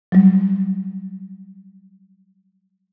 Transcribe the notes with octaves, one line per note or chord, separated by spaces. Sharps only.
F#3 G3